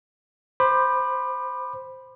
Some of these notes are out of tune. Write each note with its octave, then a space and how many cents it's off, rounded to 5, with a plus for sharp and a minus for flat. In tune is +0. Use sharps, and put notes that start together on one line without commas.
C5 +0 B5 +0 D6 +30